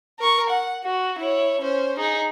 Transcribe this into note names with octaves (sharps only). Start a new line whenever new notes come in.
A#4 C#6
F#5
F#4
E4 C#5
C#4 C5
D#4 G#4